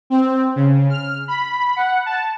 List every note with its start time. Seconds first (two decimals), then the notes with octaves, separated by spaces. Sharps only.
0.10 C4
0.56 C#3
0.90 F6
1.28 B5
1.76 F#5
2.06 A5